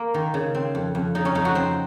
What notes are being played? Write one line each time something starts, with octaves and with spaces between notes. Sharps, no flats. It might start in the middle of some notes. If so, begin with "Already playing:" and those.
Already playing: A#3
D#3
C#3
C4
F2
F2
C#3 D#4
C#4
F2 D#4
F#4
C4 C5